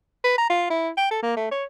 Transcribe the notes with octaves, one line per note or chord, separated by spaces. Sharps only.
B4
A#5
F4
E4
G5
A4
A#3
A3
C#5